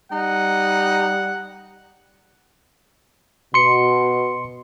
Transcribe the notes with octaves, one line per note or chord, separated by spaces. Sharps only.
G3 D#4 F#5
B2 C6 C#7